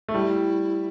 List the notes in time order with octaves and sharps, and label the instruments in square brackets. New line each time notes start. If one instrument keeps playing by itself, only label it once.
[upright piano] A3
[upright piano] G3 [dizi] E4